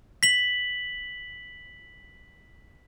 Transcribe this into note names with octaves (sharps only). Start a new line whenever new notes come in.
B6 F#7